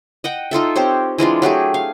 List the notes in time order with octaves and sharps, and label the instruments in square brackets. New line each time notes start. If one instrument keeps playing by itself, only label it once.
[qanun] D#5 F#5 G5
D#4 F4 A4 E5
C4 G4 C5 C#5
E3 G#3 D4 F4
F#3 A3 G4 G#4
F5